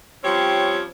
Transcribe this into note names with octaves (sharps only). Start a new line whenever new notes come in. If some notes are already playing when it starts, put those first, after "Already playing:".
F3 G3 C4 C#4 G4 C#5